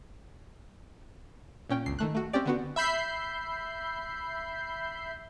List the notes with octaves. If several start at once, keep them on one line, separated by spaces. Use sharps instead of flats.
A#2 C#4 G5
G1 C#2 C7
D#3 A3 F#6
A3 F#4
C4 C#4 G4 D5
D3 B3 F#4
E5 B5 G6 C7